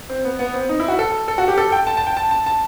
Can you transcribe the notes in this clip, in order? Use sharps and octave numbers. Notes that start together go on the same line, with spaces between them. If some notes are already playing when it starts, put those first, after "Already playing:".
C4
B3
B3
C4
D#4
E4
F#4
A4
A4
F#4
G4
A4
G5
A5
A5
G5
A5
A5
A5